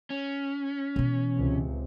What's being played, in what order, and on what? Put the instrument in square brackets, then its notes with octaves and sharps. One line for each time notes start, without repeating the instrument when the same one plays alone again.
[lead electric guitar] C#4
[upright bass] B2 E3
[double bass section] C#2 C3